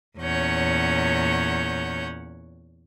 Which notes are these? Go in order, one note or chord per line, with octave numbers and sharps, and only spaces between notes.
E2 A#2 C#4 C#5 F#5 G6